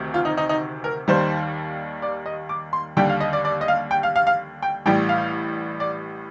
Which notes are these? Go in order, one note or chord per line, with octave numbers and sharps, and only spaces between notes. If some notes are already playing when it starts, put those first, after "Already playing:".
Already playing: D2 C3 D#3
F4
D#4
D#4
D#4
A#4
D#2 D#3 G3 C5
D5
D#5
D6
C6
D#2 D3 G3 G5
F5
D#5
D5
D5
D#5
F5
G5
F5
F5
F5
G5
A1 A2 G3 G5
F5
D5